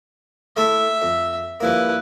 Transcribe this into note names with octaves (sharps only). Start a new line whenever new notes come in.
A3 E4 A4 E5
F2
G2 F3 A#3 E4 B4